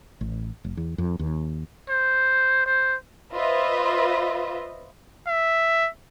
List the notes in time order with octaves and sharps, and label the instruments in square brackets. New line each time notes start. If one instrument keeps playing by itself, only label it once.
[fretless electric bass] A1
F1
E2
F2
D#2
[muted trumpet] C5
C5
[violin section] F4 B4 C5 D#5 E5
[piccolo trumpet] E5